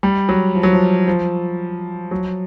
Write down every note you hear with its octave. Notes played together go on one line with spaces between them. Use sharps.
G3
F#3
F3
F#3
F3
F3
F#3